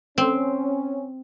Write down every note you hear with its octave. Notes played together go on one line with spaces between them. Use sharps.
C4 C#4